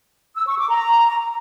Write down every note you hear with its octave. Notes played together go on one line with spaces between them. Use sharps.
E6
C#6
D6
A#5